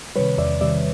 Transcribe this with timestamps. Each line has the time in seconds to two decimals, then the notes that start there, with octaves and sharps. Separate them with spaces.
0.16 C3 D#3 G3 B4 C#5
0.38 E2 D5 E5
0.61 C3 D#3 G3 D5 E5